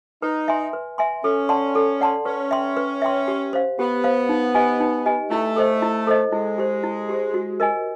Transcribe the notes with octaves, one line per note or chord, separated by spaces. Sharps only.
D#4 B4
E5 G#5 C6
B4
E5 G#5 C6
C#4 A4
D5 F#5 A5 C6
A4
D5 F#5 A5 C6
C#4 B4
E5 G5 C6
B4
E5 G5 C6
G4
C5 F5
B3 G4
C5 F5
D#4
G4 B4 D#5 G#5
D#4
G4 B4 D#5 G#5
A3 E4
A4 C5 D#5
E4
A4 C5 D#5
G#3 E4
G4 C5
E4
G4 C5
F#4
A#4 D#5 G#5